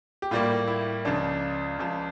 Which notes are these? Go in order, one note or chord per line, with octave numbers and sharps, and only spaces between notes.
G4
A2 G3 A#3 F4
E4
C#2 C#3 F3 D4
C#2 C#3 F3